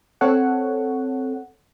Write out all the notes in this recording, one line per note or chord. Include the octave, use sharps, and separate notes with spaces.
C4 A4 C#5 F#5